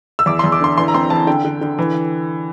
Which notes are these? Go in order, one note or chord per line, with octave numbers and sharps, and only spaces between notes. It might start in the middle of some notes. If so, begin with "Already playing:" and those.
E6
E2 D6
C6
E2
D6
D3 C6
E3 C6
A#5
C4 C6
E3 A5
D3 G5
D3
D3
E3